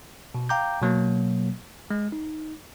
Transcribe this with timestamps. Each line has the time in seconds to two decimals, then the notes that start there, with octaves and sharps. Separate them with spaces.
0.35 B2
0.49 F5 G5 A#5 D6 G6
0.81 B2 F#3 A#3
1.90 G#3
2.12 D#4